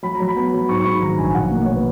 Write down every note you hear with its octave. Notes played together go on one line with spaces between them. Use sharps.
F#3 B5
A#5
F#3
B5
B3
F#3
G#2 C#6
C#6
G#2 B5
D#3 A#5
A#1 G#5
G#5
B2 F#5
A#3
A#3 C#5
B4